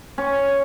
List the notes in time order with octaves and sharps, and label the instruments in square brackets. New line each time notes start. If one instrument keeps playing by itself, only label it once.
[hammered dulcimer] C#4